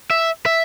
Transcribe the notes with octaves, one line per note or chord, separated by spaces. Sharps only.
E5
E5